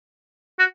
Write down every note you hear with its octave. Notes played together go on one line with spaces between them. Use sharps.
F#4